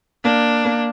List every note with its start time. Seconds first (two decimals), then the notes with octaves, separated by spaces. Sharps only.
0.24 A#3 D4
0.65 A#3